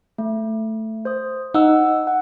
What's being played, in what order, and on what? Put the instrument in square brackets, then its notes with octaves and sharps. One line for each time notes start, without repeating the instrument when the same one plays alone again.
[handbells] A3
C5 D#6
[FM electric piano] D#4 [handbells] F#5 E6
[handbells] F#5